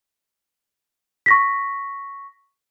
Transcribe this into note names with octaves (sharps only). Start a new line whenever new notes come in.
C#6 A#6 B6